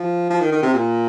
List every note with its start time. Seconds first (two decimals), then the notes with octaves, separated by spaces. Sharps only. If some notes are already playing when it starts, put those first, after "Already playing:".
Already playing: F3
0.30 F3
0.40 D#3
0.52 D#3
0.62 C3
0.74 A#2